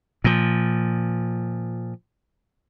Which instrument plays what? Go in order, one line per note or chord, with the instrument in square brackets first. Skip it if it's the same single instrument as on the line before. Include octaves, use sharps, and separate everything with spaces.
[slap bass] A#2 F3